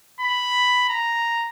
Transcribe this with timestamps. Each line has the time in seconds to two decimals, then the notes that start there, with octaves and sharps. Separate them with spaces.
0.20 B5
0.89 A#5